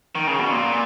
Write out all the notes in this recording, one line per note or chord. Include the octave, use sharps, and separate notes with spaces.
D#3
C#3
B2
A#2